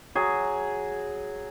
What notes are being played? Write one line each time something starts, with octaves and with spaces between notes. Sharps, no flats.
F#3 G#4